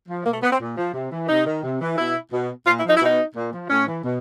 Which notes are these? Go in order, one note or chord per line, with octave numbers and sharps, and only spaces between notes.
F3
B2 A#3
A3
B3
C4
A#2
F3
C3
E3
C3 D#4
D#3
C3
E3
B2 E4
B2
A#2 F4
E4
F3
D#4
E4
B2 D#4
A#2
F3
A2 C#4
E3
B2